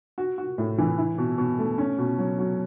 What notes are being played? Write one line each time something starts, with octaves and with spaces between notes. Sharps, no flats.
F#4
F#4
A2
E3
E4
B2
B2
A3
C#4
B2
F#3
F#3